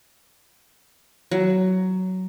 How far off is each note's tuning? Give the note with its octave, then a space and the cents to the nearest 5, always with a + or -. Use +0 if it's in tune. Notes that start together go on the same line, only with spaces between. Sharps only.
F#3 +10